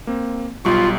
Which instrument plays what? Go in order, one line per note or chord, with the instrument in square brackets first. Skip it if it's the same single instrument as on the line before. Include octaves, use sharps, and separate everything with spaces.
[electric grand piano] A#3 C4
[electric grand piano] B1 G3 C#6 [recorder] F4